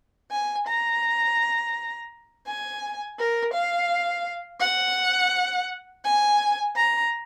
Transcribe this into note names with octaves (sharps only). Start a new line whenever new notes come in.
G#5
A#5
G#5
A#4
F5
F#5
G#5
A#5